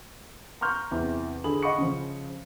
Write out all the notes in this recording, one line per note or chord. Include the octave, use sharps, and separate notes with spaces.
A#5 C6 C#6 F6 G6
E2 C3
D3 G#4 B5 F#7
D#5 F#5 B5 C#6 C#7
C#3 F3